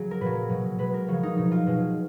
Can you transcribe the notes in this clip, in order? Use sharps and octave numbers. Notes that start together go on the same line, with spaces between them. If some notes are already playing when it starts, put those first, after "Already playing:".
Already playing: C#3 F#3 G#4
A#4
A#2 F#3 B4
B2 F#3
B2 G#3 B4
A#4
C#3 F3 G#3 C#5
D#4
B2 F#3 D#4
F4
B2 G#3